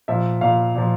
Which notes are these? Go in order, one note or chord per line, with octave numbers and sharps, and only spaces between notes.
A#2 F3 E5
A#2 F3 F5
A#2 F3